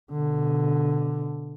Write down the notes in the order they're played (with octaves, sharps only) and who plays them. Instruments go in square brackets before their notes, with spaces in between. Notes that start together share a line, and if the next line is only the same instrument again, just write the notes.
[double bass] B2 D3